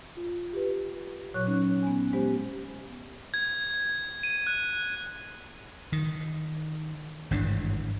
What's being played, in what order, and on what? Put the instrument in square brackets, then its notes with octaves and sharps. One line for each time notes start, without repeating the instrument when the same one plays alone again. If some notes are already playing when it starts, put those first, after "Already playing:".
[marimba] F4
G4 B4
A#2 F#3 C#5 C#6 F#6
C#4 D#4
B3 G#5
G#3 B3 G4 C5
[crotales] G#6
D#7
F#6
[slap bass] D#3
G#1 G2 E3 D4